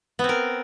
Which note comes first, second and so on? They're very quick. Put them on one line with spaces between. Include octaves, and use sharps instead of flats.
B3 C4 A#4